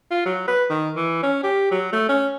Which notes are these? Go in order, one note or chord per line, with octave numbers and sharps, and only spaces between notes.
F4
F#3
B4
D#3
E3
C#4
G4
F#3
A3
C#4